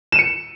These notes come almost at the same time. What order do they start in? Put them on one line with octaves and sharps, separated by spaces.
E7 D#7 C#7